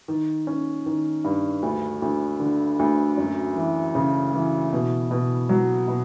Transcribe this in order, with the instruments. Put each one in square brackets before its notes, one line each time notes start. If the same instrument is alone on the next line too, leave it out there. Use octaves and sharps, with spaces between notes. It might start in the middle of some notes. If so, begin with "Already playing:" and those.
[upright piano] D#3
C#4
D#3
G2
D2
D2
D3
D2
F#2
E3
C#3
E3
B2
B2
F#3
B2